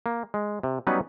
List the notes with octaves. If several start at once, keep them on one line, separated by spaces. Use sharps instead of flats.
A#3
G#3
C3
F#3 G3 B3 C#4 D#4 B4